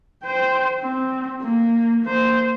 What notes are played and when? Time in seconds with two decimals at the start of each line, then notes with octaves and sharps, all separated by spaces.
0.23 C5 G5
0.80 C4
1.42 A#3
2.04 A#3 C5